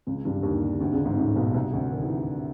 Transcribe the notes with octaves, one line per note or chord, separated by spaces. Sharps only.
C#2 C#3
G2 G3
D3
D#2 D#3
D2 D3
C#2 C#3
G#1 G#2
A1 A2
B1 B2
C2 C3
D2 D3
D#3
E3